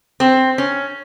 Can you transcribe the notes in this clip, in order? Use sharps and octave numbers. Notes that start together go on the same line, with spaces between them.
C4
C#4